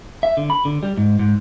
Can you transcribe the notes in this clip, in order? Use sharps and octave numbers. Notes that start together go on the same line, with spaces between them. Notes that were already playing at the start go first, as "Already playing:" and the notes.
E5
D3
B5
D3
G3
G#2
G#2